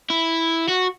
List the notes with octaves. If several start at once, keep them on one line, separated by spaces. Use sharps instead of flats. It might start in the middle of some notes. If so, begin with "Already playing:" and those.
E4
F#4